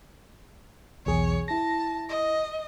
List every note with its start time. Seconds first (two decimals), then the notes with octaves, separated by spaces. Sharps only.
1.06 B1 E2 G#4 C#5
1.48 E4 A5 A#6
2.09 D#5